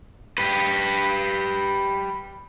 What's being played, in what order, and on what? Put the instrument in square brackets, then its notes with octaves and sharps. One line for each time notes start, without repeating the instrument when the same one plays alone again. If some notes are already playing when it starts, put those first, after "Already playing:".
[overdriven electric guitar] G4 B4